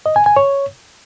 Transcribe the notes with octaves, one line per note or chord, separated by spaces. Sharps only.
D#5
G#5
G#5
C#5